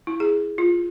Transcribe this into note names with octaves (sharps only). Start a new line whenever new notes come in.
E4
G#4
F4